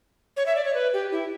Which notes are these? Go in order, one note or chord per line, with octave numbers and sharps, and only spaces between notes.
C#5
E5
D5
C#5
B4
G4
E4